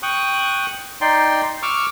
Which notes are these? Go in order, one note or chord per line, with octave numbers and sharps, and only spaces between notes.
G5 C#6 D#6 F#6
D#4 D5 G5 C6
C#6 D6 E6 F6